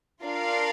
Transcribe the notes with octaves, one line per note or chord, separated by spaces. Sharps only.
D4 F4 A#4 D5 F5